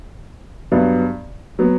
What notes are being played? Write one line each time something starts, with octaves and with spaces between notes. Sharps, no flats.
G2 F#3 B3
F#3 B3